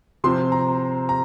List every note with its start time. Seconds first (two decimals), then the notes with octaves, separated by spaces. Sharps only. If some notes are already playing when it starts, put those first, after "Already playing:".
0.24 C3 F3 C4 C6
0.52 A#5
1.09 A#5